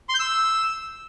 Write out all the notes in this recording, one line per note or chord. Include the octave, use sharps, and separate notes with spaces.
C6
G6
E6